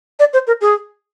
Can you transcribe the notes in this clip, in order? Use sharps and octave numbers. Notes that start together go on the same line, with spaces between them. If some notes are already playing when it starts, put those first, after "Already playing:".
D5
C5
A#4
G#4